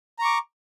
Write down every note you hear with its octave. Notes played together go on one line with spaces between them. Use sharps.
A#5 C#6 D6